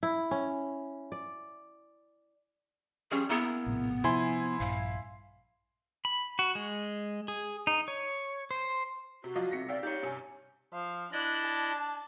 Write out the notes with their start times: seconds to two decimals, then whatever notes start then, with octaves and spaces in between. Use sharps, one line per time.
0.03 E4
0.31 C#4
1.12 D5
3.11 F3 G3 C#4 G#4
3.29 A#3 B3 E4 G#4
3.66 A#1 A2 C3
4.04 C3 F3 E4 C5 G#5 C6
4.60 A#1 G2 F5
6.05 B5
6.39 F#4
6.55 G#3
7.28 G#4
7.67 D#4
7.88 C#5
8.51 C5
9.24 C3 F#4
9.36 F3 F#3 D5 D#5 F5
9.51 B1 C3 A#6 B6 C#7
9.68 D5 E5 F5 G5
9.83 D#4 G4 C#5 D5
10.03 G2 C3 C#4 G#5
10.73 F3 F5
11.12 D4 E4 D5 D#5 F#6
11.45 A5